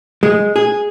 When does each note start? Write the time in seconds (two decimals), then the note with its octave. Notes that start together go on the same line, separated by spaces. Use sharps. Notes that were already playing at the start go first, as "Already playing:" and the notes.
0.23 G#3
0.56 G#4